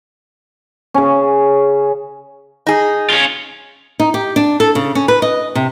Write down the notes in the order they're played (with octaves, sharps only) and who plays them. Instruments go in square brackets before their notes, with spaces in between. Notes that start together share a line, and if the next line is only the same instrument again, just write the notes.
[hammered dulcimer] C#3 C#4
[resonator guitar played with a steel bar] D#4 G#4
[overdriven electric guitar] C#4 F4
[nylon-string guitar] D#4
G4
D4
A4
C#3
C#4
B4
D#5
C3